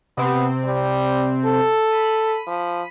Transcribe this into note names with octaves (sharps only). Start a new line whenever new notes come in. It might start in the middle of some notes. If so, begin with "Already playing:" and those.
C3 B3 C4
G3
A4
B5 B6 D#7
F3